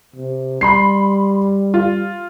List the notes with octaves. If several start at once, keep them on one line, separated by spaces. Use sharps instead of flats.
C3
G3 B5 C6 C7
F4